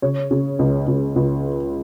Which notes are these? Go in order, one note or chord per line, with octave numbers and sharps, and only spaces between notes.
C#3 C#5
C#3
C#2
C#2
C#2